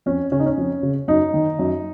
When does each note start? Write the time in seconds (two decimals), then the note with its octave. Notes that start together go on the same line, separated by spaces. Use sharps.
0.06 F2 C#4
0.32 C#3 C#4
0.39 D#4
0.46 C#4
0.58 F2
0.83 C#3
1.08 F#2 D#4
1.34 D#3
1.59 F#2